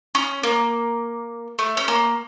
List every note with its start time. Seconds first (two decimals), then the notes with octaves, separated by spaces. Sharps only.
0.15 C#4
0.43 A#3
1.59 A3
1.77 C#4
1.88 A#3